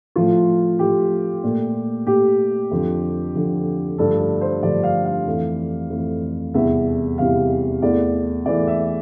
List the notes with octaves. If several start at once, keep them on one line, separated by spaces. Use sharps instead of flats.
A2 F3 A3 F4
A2 F3 A3 G4
A#2 A3
A#2 A3 G4
F2 D3 F3
F2 D3 F3
G2 D3 F3 A3 A4
A4
C5
G2 D3 F3 A3 D5
F5
F5
F2 E3 A3
F2 E3 A3
E2 C3 E3 G3 E5
E2 C3 E3 G3 F5
E2 E3 A3 D5
E2 E3 A3 D5
E5